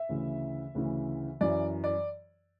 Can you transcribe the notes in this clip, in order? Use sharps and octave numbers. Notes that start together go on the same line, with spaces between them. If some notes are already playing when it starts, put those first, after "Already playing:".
Already playing: E5
D2 C#3 E3
D2 C#3 E3
F#2 E3 D5
D5